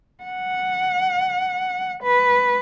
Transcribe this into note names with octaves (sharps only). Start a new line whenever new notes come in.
F#5
B4